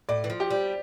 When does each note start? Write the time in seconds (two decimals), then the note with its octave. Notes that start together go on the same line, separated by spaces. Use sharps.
0.09 A2 D5
0.24 E3
0.30 F3
0.40 G4
0.51 G3